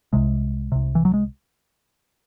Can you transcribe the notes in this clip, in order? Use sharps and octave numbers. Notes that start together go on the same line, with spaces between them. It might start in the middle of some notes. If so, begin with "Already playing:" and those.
C2 C3 G#3
C2 C3
E3
F#3
G#3